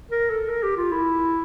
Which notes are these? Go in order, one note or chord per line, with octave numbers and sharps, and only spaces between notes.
A#4
A4
A#4
G4
F4
E4